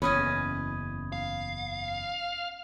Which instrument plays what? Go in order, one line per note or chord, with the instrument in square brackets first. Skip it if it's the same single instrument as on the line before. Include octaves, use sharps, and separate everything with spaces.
[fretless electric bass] F#1 E2 [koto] C#4 B4 D#5 [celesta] B5 D#6 G#6
[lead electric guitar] F5